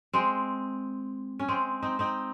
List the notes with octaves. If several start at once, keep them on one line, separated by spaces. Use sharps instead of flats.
G#3 C4
C#4
G#3 C4
C4 D#4
C4 D#4